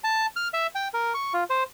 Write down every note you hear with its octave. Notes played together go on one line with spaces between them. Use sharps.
A5
F6
E5
G5
A#4
C#6
F4
C5